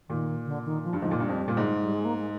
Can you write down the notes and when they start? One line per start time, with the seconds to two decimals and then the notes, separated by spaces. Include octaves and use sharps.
0.09 A#2 D#3
0.46 D3
0.65 D#3
0.84 F3
0.93 G2
1.01 G#2 F3
1.11 A#2
1.19 G2 G3
1.29 F2
1.48 A#2
1.57 G#2
1.82 G3
1.94 G#3
2.05 A#3
2.18 G#3